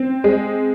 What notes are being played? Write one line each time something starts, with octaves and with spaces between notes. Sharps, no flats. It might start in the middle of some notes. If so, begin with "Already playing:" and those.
Already playing: C4
G#3